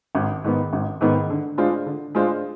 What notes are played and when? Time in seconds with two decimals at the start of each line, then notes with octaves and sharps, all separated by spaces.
0.15 G#1
0.44 G#2 D#3 B3
0.73 G#1
1.01 G#2 D#3 B3
1.30 D3
1.58 G#3 D4 F4 C5
1.86 D3
2.15 G#3 D4 F4 C5